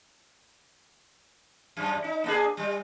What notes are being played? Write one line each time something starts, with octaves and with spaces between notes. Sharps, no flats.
F#2
D#4
A#3 D4 G#4
G3